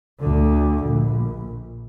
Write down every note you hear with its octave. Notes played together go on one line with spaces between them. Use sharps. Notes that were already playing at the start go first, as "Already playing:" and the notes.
D2 D3
A#1